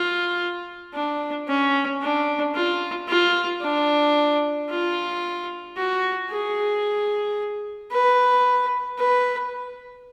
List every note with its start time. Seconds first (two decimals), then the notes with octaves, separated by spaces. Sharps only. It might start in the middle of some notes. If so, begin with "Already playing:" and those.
Already playing: F4
0.94 D4
1.48 C#4
2.02 D4
2.55 F4
3.08 F4
3.62 D4
4.70 F4
5.76 F#4
6.31 G#4
7.92 B4
8.99 B4